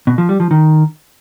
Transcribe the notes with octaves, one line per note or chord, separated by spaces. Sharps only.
B2
F3
G3
F3
D#3